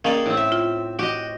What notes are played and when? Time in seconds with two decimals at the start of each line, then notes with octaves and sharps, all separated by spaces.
0.05 D#3 A#3 C#4 G#4 D5 D#5 F5
0.26 A2 C4
0.37 E5
0.52 F4
0.99 F#4 G4 D#5